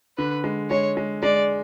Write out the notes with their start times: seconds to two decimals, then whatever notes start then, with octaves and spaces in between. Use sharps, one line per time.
0.18 D3 B4
0.44 G#3
0.70 G#3 C#5
0.97 G#3
1.23 G#3 D5